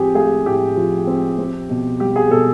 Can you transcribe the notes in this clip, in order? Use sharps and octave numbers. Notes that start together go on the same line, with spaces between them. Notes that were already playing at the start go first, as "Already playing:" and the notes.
Already playing: A2 F3 C4 G4 G#4
A3 G#4
A2 G4
F3
C4
C4
B2
G3 G4
G#4
B2 A4